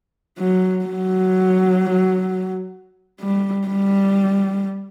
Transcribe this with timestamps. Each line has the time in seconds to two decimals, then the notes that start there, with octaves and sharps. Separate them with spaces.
0.39 F#3
0.85 F#3
3.21 G3
3.68 G3